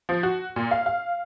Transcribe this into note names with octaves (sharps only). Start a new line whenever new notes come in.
F3
F#4
A#2
F5
F5